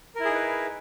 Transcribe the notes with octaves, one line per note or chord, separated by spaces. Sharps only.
D#4 E4 G#4 A#4 B4